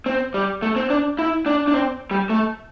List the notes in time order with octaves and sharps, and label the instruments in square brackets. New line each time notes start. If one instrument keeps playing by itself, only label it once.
[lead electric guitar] C4
G3
A3
C4
D4
E4
D4
D4
C4
G3
A3